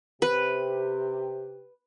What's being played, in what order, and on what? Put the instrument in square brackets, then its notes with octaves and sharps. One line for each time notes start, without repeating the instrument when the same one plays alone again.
[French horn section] C3 G4 [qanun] B4